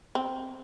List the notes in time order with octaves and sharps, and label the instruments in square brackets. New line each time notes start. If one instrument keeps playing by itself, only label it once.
[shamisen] C4